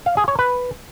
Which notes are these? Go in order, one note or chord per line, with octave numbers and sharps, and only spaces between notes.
F5
G#4
C#5
B4